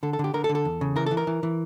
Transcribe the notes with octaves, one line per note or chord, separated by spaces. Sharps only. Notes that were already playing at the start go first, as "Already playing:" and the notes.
D3 A4
A4
D3
G4
D3 A#4
A4
D3
A4
E2
C#3
E3 A#4
E3 A4
A#4
E3
E3